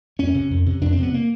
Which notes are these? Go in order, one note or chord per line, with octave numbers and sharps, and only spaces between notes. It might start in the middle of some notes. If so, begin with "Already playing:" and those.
F2 C#4
C3
F2
C3
F2 D4
C4
C3
B3
A#3